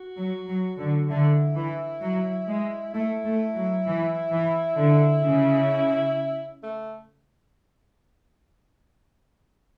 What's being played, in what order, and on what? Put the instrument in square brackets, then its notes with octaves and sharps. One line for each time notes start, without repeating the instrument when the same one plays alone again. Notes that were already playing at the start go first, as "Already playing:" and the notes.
Already playing: [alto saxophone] F#4
[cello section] F#3
F#3
D3
[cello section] D3 [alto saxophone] E4
[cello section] E3
F#3
G#3
[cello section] A3 [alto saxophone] E4
[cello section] A3
F#3
E3
E3
D3
C#3
[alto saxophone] A3